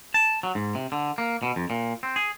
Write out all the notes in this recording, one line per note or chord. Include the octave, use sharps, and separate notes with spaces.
A5
F#3
G#2
C3
D3
A#3
B2
F2
A#2
C4
G#4